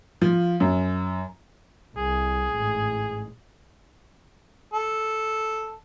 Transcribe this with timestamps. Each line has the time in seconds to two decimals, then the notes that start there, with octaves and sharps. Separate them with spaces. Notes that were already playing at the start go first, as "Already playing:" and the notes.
0.22 F3
0.60 F#2
1.97 C2 G#4
2.55 A1 G#2
4.73 A4